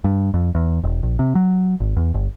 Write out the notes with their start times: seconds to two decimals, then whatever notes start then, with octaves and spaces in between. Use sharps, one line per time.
0.04 G2
0.34 F2
0.55 E2
0.84 E1
1.03 A#1
1.19 C3
1.35 F#3
1.80 G#1
1.97 E2
2.14 G1